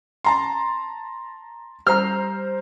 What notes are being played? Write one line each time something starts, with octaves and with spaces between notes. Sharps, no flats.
A5 A#5 C6
G3 C5 A#5 F6